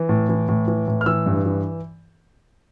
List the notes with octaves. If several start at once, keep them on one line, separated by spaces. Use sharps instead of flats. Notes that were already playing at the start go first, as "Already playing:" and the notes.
Already playing: E3
A2
E3
A2
E3
A2
F6
E3 E6
G2
E3